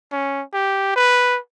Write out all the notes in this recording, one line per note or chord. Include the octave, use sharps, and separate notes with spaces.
C#4
G4
B4